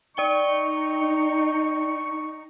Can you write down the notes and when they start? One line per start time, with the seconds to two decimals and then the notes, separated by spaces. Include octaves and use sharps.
0.17 D#4 D5 G5 C#6 G7